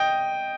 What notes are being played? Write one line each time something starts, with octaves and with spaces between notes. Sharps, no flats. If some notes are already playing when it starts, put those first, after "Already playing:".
Already playing: D#5 G5